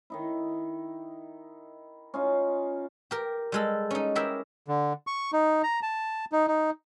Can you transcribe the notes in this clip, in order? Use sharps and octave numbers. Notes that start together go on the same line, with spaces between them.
D#3 D#4 E4
C#4 D#4 F4
G4 A#4
G3 G#3 A4
C#4 D#4
E4 G4 G#4 A#4 E5 G5
D3
C#6
D#4
A#5
A5
D#4
D#4